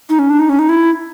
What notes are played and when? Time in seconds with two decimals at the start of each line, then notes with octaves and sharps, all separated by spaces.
0.09 D#4
0.19 C#4
0.29 D4
0.39 D#4
0.49 C#4
0.59 D#4
0.69 E4